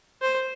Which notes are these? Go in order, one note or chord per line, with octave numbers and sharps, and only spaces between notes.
C5